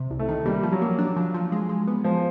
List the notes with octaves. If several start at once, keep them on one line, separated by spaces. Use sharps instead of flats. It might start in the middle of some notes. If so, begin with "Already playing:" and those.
Already playing: C3
C2
A3
D#3
G3 A#3
F3
F#3
A#3
D4
F3
F3
G#3
G#3
B3
F3 G#3